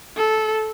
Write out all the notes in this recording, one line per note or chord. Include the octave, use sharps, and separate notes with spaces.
A4